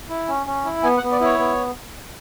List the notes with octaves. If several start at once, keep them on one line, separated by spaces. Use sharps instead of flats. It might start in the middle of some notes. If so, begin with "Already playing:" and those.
E4
C#4
C#4
E4
B3 G#5
F#5
B3
D5
E4 C#5
B3